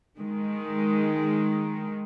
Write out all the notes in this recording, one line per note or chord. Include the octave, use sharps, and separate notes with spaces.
D#3 G#3